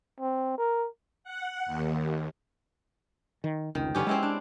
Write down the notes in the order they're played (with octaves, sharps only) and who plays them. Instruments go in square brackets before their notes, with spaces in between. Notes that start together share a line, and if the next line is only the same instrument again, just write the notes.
[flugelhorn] C4
A#4
[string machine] F#5
D#2
[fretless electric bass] D#3
[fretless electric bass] F1 C#2 [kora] D#3
[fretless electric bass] G2 D3 [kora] B3 C#4 G4
[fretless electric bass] G#3 [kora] C4 C#4 E4
[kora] D4